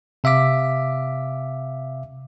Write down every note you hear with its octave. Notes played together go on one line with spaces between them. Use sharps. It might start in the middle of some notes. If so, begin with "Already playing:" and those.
C3 E5 F5 D6 B6